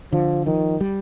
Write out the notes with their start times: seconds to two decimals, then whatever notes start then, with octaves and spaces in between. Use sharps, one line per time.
0.12 D3 F3
0.46 D#3 F3
0.81 G3